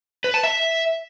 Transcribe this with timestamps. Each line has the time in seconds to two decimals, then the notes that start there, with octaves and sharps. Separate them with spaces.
0.24 B4
0.34 A5
0.44 E5